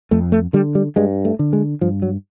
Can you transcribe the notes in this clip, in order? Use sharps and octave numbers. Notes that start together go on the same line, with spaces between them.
F2 A3
A3
D3 G3
G3
G2 G#3
A3
D3
G#3
G2 F3
F#3